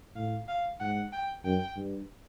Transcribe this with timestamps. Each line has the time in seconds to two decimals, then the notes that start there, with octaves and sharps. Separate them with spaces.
0.16 A2 F5
0.48 F5
0.80 G#2 F#5
1.12 G5
1.44 F#2 G5
1.77 G2